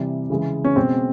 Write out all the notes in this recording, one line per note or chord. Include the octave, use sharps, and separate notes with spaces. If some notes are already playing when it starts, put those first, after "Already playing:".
Already playing: C3 E3 G3
C#3 E3 G#3
C#4
B2 G#3 C4